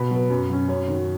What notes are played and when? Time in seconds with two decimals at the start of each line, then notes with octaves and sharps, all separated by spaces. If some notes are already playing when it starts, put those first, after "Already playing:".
Already playing: B2 B5
0.11 F#3 B3
0.30 F#2
0.50 F#3 C#4
0.68 F#2 C#5
0.88 D#3 F#3